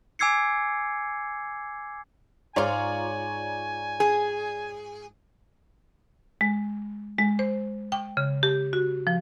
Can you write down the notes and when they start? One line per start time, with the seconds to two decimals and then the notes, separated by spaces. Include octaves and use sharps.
0.19 G#5 D6 E6 G#6 C7 C#7
2.56 G#2 F4 C#5 D5 G#5 A#5
4.00 G#4
6.41 G#3
7.18 G#3
7.39 C5
7.92 G5
8.17 C#3
8.43 G4
8.73 F#4
9.07 F3